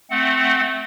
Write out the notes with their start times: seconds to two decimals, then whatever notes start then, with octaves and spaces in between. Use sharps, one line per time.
0.10 A3 C4 F#5